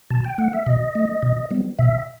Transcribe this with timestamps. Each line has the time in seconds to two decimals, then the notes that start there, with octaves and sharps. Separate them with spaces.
0.10 B2 A5
0.24 G5
0.38 A3 F#5
0.53 E5
0.66 B2 D#5
0.95 A3
1.23 B2
1.51 G3 B3
1.79 B2 E5